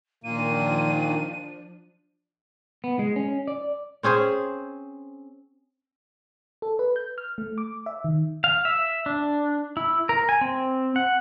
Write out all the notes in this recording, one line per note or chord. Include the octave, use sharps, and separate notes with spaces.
A#2 D#3 F3 A#3 D4 D#7
B3
G#3
C#4
D5
C4 C#4 G#4 C5
A4
B4
G6
F6
A3
D6
E5
D#3
F5
E5
D4
E4
A#4
G#5
C4
F#5